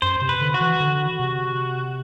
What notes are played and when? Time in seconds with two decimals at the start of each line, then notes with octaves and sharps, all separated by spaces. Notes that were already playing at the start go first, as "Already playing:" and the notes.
0.02 F#2 C5
0.22 C3
0.29 B4
0.41 D3
0.54 F#4
0.61 E3
0.80 D3
1.20 C3